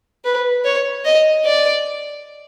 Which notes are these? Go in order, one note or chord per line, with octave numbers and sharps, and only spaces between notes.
B4
C#5
D#5
D5